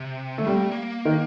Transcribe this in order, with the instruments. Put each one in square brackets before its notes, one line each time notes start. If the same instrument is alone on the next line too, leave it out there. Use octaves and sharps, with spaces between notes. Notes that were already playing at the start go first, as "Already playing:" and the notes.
Already playing: [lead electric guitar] C3
[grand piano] A3
[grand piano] G3 [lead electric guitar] C4
[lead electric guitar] A#3
A3
A#3
[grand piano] D#3